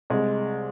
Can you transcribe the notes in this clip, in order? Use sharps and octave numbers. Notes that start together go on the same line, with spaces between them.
C2 G#3